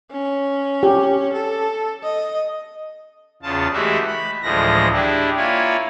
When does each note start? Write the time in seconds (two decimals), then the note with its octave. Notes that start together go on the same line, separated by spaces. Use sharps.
0.12 C#4
0.83 G4
1.33 A4
2.03 D#5
3.43 E2 C#3 F4 A5
3.73 E3 G#3 A3 F#4 G4 E5
4.07 B5
4.43 D2 A2 E3 F3 G#3 A#6
4.93 D4 E4 G4 G#4
5.37 A#3 E4 F4 C#5 G#5